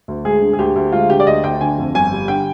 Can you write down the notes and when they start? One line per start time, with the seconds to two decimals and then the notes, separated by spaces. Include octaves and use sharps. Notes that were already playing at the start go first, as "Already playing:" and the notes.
0.08 D2
0.25 G#3 G#4
0.42 D3
0.53 G#4
0.59 D2 G4
0.76 D2
0.92 G#3 F4
1.09 D3 G4
1.20 D5
1.27 D2 D#5
1.44 D2 G5
1.61 D3 G#5
1.78 F2
1.94 G1 G#5
2.12 G3
2.28 D3 G5